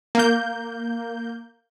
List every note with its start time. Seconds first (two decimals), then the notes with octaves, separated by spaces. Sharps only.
0.15 A#3 G6